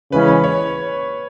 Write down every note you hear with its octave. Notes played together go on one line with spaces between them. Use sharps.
C#3 E3 G#3 C#4 B4
B4
C#5